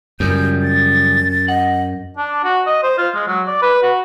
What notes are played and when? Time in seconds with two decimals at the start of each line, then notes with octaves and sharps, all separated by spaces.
0.20 F#2 C#3 F3 G3 G6
0.63 A6
1.48 D#5 F#5
2.17 D4
2.44 F#4
2.66 D#5
2.83 C5
2.98 F4
3.14 G#3
3.27 F#3
3.47 D5
3.62 B4
3.82 F#4